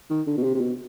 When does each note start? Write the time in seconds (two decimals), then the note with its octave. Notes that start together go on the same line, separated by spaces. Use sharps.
0.10 D#3
0.27 D3
0.37 B2
0.43 C3
0.55 C3
0.61 B2